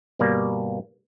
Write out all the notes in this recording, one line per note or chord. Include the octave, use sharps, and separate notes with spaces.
G1 B2 G3 A#3 D5